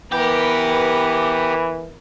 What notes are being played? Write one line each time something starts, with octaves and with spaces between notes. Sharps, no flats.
E3 B3 G4 A#4